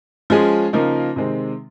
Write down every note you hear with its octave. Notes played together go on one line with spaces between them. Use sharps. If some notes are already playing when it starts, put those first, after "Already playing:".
F3 G#3 C#4 G#4
C#3 F3 A#3 D#4
C3 D#3 G#3 C4